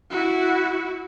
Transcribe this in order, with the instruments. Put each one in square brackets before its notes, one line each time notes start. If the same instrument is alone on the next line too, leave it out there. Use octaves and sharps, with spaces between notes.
[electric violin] E4 F#4